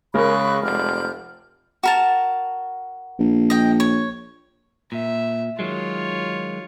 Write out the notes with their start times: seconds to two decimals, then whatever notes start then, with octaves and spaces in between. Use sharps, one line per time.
0.14 C#3 G#3 A#4 B5 C#6 F#6
0.63 F1 D5 F6 G6
1.83 F#4 A#4 A5
3.19 A#1
3.50 D#5 G5
3.80 C#5
4.92 A#2 E5
5.59 D#3 F#3 G#3 F4 C#5